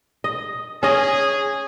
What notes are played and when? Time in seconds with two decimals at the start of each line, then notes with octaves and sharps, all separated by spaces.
0.24 D#5
0.83 C#4 G#4 D#5